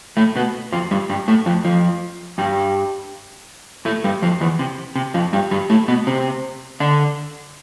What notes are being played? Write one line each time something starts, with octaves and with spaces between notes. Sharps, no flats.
A2 A3
B2 B3
F2 F3
G2 G3
G2 G3
A2 A3
F2 F3
F2 F3
G2 G3
A2 A3
G2 G3
F2 F3
E2 E3
C3
C3
F2 F3
G2 G3
G2 G3
A2 A3
B2 B3
C3 C4
D3 D4